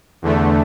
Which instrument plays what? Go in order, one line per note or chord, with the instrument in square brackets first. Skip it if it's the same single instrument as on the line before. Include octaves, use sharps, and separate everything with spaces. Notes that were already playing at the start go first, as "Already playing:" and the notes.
[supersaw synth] E2 D3 A3